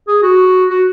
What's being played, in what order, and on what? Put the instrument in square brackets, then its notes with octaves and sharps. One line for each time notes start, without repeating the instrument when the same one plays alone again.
[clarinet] G#4
F#4
F#4